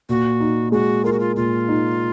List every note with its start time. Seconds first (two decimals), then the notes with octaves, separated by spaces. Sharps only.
0.09 A#2 F#4
0.40 D#4
0.72 G#3 F#4
1.04 F4 A#4
1.13 F#4
1.20 F4
1.36 A#2 F4
1.68 D#4